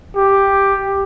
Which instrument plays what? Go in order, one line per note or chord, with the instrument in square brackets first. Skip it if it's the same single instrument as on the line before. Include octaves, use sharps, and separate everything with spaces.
[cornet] G4